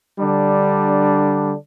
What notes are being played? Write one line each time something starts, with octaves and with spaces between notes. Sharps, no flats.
D3 G3 D4